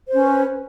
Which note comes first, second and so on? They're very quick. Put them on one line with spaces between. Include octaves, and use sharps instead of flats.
C5 C#4 B4